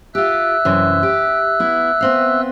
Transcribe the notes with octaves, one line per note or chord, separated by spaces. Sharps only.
F4 G4 E5 E6 F#6
F#2 C3 E3
G4
B3 E4
B3 C4 F5